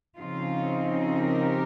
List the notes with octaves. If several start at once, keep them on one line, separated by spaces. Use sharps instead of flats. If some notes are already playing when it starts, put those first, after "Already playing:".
C#3 F3 C4 D#4 F4
G4 A#4